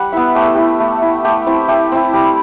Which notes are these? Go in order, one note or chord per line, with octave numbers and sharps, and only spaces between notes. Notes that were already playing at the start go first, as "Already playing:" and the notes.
Already playing: G3 F#5
B3 E4 E5
A3 G4
A4
E4 G4
A3
E4
A3 G4
C4 E4
A3 G4
C4 E4
G3